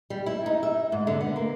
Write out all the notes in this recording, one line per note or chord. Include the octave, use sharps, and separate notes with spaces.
G3
E4
D#4
E5
G#2
D3
B3
A#3